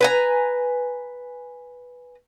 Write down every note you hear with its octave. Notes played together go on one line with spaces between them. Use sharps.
B4 G#5 A#5